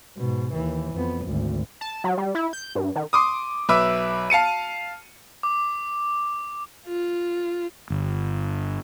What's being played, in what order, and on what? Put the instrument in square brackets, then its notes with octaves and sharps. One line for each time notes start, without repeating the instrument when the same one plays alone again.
[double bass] G#2 B2
D#2 E3
F2 B3
G#1 D2
[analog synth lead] A5
F#3
G3
E4
G6
G2
D#3
[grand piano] C6 D6 D#6
B1 B4 E5 D6 E6
F5 A5 C#7 D#7
[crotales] D6
[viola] F4
[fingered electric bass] G1